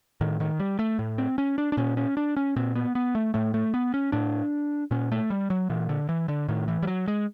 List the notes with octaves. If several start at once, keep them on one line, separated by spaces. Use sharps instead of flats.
A2 D#3
D#3
G3
A3
A2
C4
C#4
D4
D4
A#2 C#4
C#4
D4
C#4
A#2 C4
B3
B3
A3
A2 A3
A3
B3
C#4
A2 D4
A#2 C#4
A3
G3
F#3
A#2 E3
D3
E3
D3
A2 D#3
E3
G3
F#3
G#3